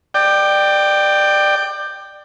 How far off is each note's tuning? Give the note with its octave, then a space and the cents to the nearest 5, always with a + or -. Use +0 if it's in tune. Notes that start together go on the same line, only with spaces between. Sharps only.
D5 +25 G5 +0